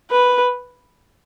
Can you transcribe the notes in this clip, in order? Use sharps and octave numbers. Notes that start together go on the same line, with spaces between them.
B4